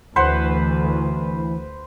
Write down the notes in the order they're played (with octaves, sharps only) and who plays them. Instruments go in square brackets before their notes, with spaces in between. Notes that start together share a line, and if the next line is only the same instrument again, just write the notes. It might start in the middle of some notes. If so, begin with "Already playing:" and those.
[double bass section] D2 [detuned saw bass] E3 [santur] B4 C5 F#5